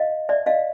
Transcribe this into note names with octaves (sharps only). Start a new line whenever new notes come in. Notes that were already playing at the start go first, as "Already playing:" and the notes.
Already playing: D#5 F5
D5 E5
D#5 F5